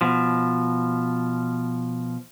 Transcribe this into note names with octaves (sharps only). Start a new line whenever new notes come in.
B2 F3